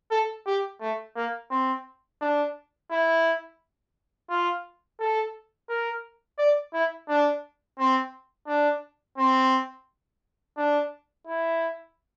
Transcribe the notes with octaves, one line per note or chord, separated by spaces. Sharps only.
A4
G4
A3
A#3
C4
D4
E4
F4
A4
A#4
D5
E4
D4
C4
D4
C4
D4
E4